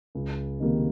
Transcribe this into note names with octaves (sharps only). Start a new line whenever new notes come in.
C#2
C3 D#3 G3 A#3